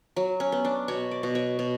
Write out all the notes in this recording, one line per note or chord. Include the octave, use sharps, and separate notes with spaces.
F#3
C#4
B3
D4
B2 C#5
D5
B2
C#5
B2